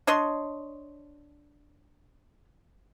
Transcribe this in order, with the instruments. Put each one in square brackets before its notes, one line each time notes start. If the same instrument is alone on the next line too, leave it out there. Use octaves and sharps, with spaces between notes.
[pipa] D4 C#5 D#5 C6